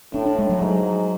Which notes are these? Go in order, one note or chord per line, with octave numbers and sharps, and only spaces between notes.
A2 D4
D4
G#3
F#3
G#2 F#3